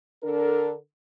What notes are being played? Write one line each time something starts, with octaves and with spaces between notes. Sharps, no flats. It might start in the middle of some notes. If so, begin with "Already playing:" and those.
D3 D4 A4 A#4